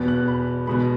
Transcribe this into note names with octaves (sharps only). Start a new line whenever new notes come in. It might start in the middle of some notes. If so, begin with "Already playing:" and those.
Already playing: E2 B2 B3
F#6
B5
B2 G#3 B3 B5